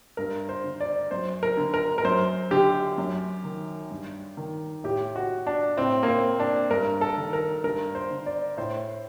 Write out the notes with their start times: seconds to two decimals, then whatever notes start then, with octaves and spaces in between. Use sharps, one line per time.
0.17 G2 A#4
0.49 C5
0.64 D3
0.81 D5
1.11 F#2 C5
1.43 A#4
1.57 D3
1.74 A#4
1.98 A#4
2.05 F#2 C5
2.51 D3 G4
2.98 F#2
3.44 D#3
3.91 G2
4.37 D#3
4.84 A2 G4
5.16 F#4
5.47 D4
5.77 A2 C4
6.03 A#3
6.08 C4
6.40 D4
6.71 G2 A#4
7.01 A4
7.18 D#3
7.33 A#4
7.64 G2 A#4
7.95 C5
8.11 D3
8.26 D5
8.57 A2 C5